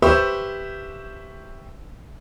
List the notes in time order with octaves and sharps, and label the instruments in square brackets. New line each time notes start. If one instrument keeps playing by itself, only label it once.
[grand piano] G4 B4 C5 E5 C#6 E6